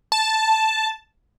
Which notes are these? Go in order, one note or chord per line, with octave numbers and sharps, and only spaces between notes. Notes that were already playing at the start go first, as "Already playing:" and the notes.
A5